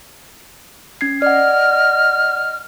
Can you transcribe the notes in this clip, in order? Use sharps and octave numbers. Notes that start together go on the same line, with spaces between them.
C#4 G#6 C7
D5 D#5 F#5 F6